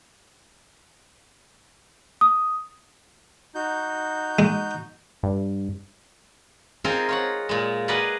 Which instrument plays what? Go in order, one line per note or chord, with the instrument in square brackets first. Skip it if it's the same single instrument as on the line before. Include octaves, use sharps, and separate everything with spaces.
[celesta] D#6
[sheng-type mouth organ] D#4 F#4 G6
[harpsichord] G#3
[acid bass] G2
[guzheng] C4 D#4 F4 G#4 A#4 C5
F4 C#5 F#5
A#2 G#3
G#4 A#4 B4 D5 D#5 F#5